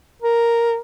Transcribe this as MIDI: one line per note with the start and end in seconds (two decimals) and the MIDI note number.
0.22 0.79 70